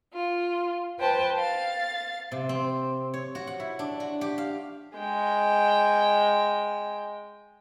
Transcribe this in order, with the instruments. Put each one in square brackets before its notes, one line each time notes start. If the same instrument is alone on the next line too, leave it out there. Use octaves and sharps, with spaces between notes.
[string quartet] F4
B4 C5 G5 A5
F5 A6
[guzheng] C3
C4
C#5
F#4
F#5
E4
D4
F#4
G4
F5
[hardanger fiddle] G#3 G5